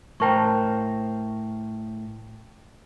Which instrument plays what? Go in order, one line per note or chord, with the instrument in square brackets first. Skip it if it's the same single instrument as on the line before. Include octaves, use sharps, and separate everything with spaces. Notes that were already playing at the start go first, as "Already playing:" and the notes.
[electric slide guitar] A2 A#4 C5 [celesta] G5 A5 C#6